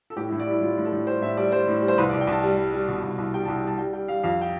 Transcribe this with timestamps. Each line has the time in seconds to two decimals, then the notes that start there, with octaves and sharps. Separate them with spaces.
0.10 A4
0.16 A2 G4
0.28 E4
0.32 A2
0.40 D5
0.47 G3 E4
0.62 A2 F4
0.78 A2
0.85 A4
0.92 A2
1.07 G3 C5
1.22 A2 E5
1.37 G3 D5
1.52 G3 C5
1.68 A2
1.82 G3
1.88 C5
1.98 C2 B4
2.09 D5
2.13 C2
2.21 G5
2.27 C2 A5
2.43 G3
2.57 G3
2.74 G3
2.88 B2
3.03 C2
3.18 C2
3.34 G3 G5
3.45 A5
3.48 C2
3.57 G5
3.64 G3 A5
3.78 G3 G5
3.93 G3 G5
4.08 G3 F5
4.23 F2 F5
4.41 G5